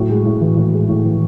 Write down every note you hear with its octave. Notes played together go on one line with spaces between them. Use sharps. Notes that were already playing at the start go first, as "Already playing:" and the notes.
Already playing: A2 F#3
G#3
A2
E3
A2
G#3
A2
E3